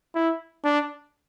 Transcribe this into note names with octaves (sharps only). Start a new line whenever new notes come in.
E4
D4